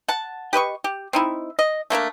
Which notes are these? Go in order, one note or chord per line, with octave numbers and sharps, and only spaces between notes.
F#5 A5
G4 B4 D#5 C#6
G4
C4 D#4 E4
D#5
A3 A#3 D4 A#4